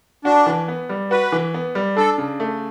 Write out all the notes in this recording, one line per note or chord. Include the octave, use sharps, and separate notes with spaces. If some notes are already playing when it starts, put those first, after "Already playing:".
D4 F#4
E3
B3
G3
F#4 B4
E3
B3
G3
D4 A4
C#3
A3